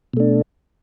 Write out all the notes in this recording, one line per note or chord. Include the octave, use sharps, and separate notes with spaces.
B2 A3 D4